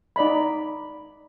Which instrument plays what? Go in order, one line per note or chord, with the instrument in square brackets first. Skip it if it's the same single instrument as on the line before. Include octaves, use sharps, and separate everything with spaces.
[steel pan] D#4 D5 D#5 B5